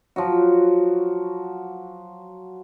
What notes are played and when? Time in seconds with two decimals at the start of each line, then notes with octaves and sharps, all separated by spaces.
0.16 F3 F#3 F#4